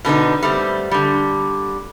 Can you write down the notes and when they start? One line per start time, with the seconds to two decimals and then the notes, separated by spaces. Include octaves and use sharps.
0.05 B2 D3 B3 D#4
0.42 G3 A3 B3 C4
0.91 D3 G3